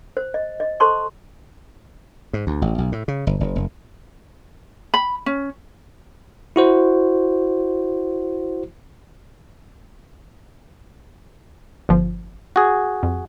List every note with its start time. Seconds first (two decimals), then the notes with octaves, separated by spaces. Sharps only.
0.17 C5
0.34 D#5
0.60 D#5
0.80 A4 C5 A5 C6 C#6
2.33 G#2
2.47 D2
2.62 A1
2.78 B1
2.92 A2
3.08 C#3
3.27 G1
3.40 F#1
3.55 F#1
4.94 B5
5.26 C#4
6.56 E4 F#4 C5
11.89 G1 F3
12.56 F#4 G#4
13.03 F2